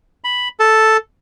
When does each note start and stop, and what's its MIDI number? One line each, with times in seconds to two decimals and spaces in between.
0.24 0.48 83
0.59 0.97 69